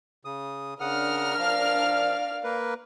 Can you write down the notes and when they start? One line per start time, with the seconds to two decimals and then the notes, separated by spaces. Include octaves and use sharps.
0.25 C#3 D#6
0.80 C#3 D4 A#4 F#5 D#6 F6
1.38 F3 D5 F5
2.44 A#3 A#4 B4